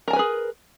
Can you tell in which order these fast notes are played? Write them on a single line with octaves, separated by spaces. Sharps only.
A#4 A5 G#5 B4 G#4